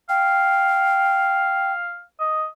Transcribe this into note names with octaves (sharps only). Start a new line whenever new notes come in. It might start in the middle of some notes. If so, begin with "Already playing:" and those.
F5 G5
D#5